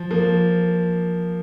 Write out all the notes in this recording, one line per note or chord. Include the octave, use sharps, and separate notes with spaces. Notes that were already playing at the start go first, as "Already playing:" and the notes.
Already playing: F3
F3 A#3